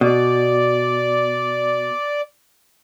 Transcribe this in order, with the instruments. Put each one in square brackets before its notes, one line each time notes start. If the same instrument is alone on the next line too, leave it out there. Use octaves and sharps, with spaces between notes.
[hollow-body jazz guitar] B2 [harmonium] D5